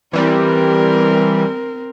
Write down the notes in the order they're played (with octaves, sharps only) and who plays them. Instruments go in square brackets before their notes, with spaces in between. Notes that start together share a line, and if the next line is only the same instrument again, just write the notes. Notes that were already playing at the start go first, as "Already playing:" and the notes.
[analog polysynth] E3 G3 [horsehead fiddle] C4 A#4